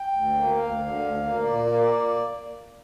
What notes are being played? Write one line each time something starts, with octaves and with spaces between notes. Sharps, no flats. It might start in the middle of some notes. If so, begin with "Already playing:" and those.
Already playing: G5
D2
A#3
D2 F5
D3
D2
A#3
A#2 D5
A#3